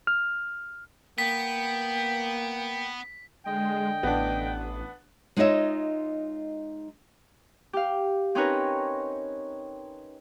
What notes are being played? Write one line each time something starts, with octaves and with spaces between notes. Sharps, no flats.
F6
A#3 B3 G5 B6
D3 G#3 D#5 G5
A1 B3 D4
G#3 D#4 F4 C#5 D#5 E5
G4 F5
C4 C#4 D#4 A#4 B4 C#5